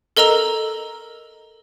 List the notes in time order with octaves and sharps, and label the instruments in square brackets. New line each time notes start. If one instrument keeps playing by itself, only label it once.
[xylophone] A4 A#4 D#5 A#5 E6